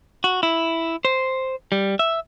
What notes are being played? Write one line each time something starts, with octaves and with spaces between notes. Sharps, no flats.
F#4
E4
C5
G3
E5